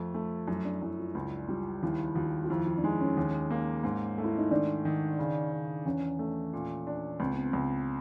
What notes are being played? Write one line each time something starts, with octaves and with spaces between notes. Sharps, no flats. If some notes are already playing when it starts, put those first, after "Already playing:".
Already playing: F2 A3
A3
F#2 E4
D4
F#2 E4
F4
C#2 E4
G3 F4
D#2 E4
D#2 F4
F4
F2 E4
E4
D4
G#3 D#4
C#4
D#2 C#4
A#3
G#2
A3
E4
D#4
D#3 D4
D#3
C#3
C#3
E2 C#4
A3
A#2
D4
C#2 C4
B3
C4
C#2